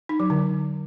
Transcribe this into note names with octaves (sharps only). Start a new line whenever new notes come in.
D#4
F#3
D3